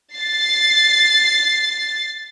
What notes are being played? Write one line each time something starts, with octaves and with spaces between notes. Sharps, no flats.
A6 C7